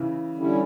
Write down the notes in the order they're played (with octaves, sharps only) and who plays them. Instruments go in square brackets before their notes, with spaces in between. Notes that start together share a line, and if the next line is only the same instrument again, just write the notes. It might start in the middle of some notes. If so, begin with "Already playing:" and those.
Already playing: [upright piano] C#3 E3
[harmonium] D3 G3 C#4 E4